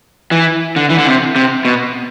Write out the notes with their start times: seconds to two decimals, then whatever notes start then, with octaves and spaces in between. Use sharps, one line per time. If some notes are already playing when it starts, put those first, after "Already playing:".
0.31 E3
0.76 D3
0.90 E3
0.98 D3
1.06 C3
1.36 C3
1.65 B2